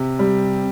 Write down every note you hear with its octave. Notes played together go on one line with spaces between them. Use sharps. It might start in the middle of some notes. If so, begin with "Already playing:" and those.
Already playing: C3
G3